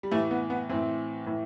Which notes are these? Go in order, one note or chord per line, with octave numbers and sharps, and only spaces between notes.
G3
A2 E3 A3
B3
B3
A2 E3 C4
A2 E3